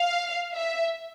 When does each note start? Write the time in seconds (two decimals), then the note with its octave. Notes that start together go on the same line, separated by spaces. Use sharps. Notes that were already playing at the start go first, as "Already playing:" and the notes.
Already playing: F5
0.54 E5